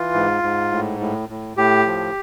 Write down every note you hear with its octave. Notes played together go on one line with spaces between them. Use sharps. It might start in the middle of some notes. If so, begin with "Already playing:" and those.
Already playing: E3 F4
G#2
G#2
A2
A2
A2
A2 G4
F3